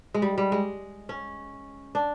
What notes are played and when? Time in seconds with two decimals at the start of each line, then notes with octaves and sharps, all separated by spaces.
0.14 G#3
0.22 G3
0.38 G3
0.52 G#3
1.09 C#4
1.95 D4